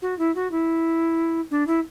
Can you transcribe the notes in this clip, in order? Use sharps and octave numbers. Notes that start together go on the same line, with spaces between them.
F#4
E4
F#4
E4
D4
E4